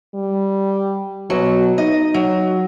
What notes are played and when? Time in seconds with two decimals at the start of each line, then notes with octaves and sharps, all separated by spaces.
0.14 G3
1.30 B2 F#3
1.78 D#4 D#5
2.14 F#3